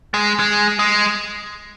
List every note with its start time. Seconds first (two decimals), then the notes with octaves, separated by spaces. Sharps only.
0.14 G#3
0.39 G#3
0.79 G#3